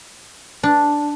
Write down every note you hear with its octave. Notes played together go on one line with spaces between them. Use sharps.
D4